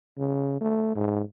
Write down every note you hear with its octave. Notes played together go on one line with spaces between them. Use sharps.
C#3
A3
G#2